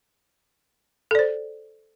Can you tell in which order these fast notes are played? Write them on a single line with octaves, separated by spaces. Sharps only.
A4 D5 C5